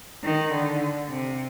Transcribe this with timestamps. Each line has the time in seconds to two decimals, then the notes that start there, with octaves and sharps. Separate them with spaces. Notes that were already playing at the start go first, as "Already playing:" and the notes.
0.24 D#3
0.52 D3
1.09 C3